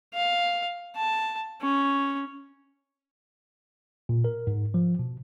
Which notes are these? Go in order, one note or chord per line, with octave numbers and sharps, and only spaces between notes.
F5
A5
C#4
A#2
A#4
G#2
F3
B2